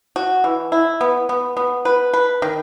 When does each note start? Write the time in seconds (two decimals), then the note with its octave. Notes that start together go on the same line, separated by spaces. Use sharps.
0.16 F#4
0.44 E3
0.72 E4
1.01 B3
1.29 B3
1.57 B3
1.85 B4
2.13 B4
2.42 D#3